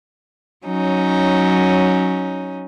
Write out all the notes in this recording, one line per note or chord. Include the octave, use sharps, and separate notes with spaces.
F#3 C#4 D#4